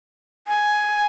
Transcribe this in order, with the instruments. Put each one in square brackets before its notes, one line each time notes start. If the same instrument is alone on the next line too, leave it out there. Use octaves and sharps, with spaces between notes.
[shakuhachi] G#5